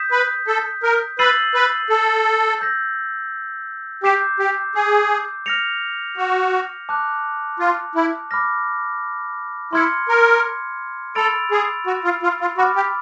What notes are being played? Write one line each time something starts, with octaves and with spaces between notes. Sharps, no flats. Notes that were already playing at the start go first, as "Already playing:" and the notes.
Already playing: D#6 G6 B6 E7
B4
A4
A#4
B4 E6 A6 C7 D#7 F#7
B4
A4
E6 G6 A#6
G4 D6 G6 C7 E7
G4
G#4
F6 A#6 C#7 F7
F#4
A5 D6 F#6
F4
E4
B5 D6 F6 A#6
E4 C6 F6 G#6 C#7
A#4
A4 B5 E6 A6 D7 F7
G#4
F#4
F4
F4
F4
F#4 B5 D6 F6
G4